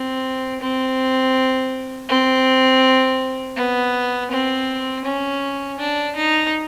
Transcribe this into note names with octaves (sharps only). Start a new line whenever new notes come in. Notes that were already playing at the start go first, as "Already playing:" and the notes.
Already playing: C4
C4
C4
B3
C4
C#4
D4
D#4